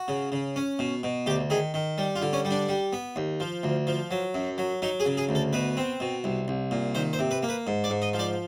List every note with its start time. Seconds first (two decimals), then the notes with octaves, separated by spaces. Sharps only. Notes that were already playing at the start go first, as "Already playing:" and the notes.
Already playing: F#4
0.08 C#3
0.32 C#3
0.56 C#4
0.79 B2
1.03 B2
1.26 D2 G4
1.50 D#3 G#4
1.74 D#3
1.98 G3
2.16 F4
2.22 D3
2.33 C#4
2.45 G3
2.51 D4
2.69 G3
2.93 B3
3.16 D#2
3.40 F3
3.63 D2
3.87 F3
4.11 F#3
4.34 F#2
4.58 F#3
4.82 F#3 D#4
5.00 G#4
5.06 C#3
5.17 G#4
5.29 D2
5.35 A4
5.53 B2 B4
5.77 C4
6.00 B2
6.24 C2
6.48 C2
6.71 A#2
6.95 D#3 C5
7.13 C5
7.19 C3
7.31 B4
7.43 A#3
7.49 B4
7.67 G#2
7.84 D5
7.90 G#2
8.02 D#5
8.13 F3
8.19 D5